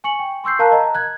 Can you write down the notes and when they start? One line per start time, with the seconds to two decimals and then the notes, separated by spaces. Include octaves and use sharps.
0.04 G#5 C#6 C#7 F#7
0.19 G5
0.44 C6 C#6 E6 G6 C7
0.59 A#4 F5 A5 A#5 F#6
0.72 D#5 A#5
0.95 F#6 G#6